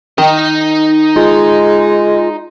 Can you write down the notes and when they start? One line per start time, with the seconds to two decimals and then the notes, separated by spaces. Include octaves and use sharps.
0.18 D#3 D#4 D#5
1.16 G#3 F4